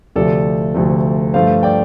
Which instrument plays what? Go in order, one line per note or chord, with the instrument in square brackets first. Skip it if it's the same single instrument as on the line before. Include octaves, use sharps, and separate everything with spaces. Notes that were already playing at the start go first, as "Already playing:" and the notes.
[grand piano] D2 C3 F3 A3 A4 D5
D2 C3 F3 A3
G2 F3 A3 C5 F5
D5 G5